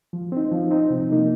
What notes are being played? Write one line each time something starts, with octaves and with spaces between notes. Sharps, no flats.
F3
C4 D#4
F3
C4 D#4
C3
F3 A#3 D#4